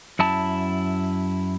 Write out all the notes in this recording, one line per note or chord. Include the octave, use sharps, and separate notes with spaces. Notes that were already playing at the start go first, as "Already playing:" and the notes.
F#2 E4 A5